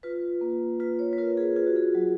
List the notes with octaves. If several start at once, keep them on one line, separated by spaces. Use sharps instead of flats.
F4 B4
A#3
F4 B4
C#5
B4
F4 A#4
G#4
F4 G#4
F#4
G#4
F#3